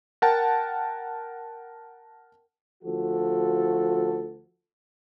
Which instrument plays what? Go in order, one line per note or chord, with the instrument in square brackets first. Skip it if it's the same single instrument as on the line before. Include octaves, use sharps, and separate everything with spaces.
[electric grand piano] A#4 F#5 G5 A5
[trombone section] D2 F3 F#4 A4